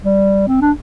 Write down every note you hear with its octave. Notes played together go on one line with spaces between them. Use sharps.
G3
C4
D4